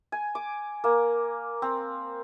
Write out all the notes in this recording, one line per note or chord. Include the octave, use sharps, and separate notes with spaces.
G#5
D6
A#3
C4